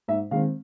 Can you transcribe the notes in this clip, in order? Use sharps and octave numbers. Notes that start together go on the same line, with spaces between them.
G#2 E5
D#3 G#3 C4 F5